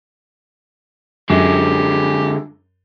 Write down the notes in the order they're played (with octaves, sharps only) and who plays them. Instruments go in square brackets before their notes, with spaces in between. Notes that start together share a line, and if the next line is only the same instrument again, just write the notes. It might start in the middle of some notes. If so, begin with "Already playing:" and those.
[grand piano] F#2 [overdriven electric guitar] D3 G#3 [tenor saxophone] G4